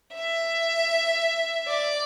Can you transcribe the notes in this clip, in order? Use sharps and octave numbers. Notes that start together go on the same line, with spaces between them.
E5
D5